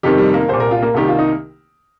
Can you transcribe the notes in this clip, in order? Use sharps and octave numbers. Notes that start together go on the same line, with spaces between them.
F2 C3 D#3 G4
G3
A#3
C2 A#2 C5
A#4
F4
A#3
C2 C3 D#3 G4
F4
D#4